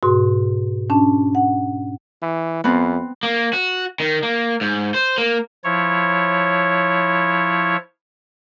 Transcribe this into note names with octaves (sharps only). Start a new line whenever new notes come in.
G#2 B2 F#4 C6
C#4 D4 A5
F#5
E3
F2 B3 C4
A#3
F#4
D#3
A#3
G#2
C5
A#3
F3 E4 C#5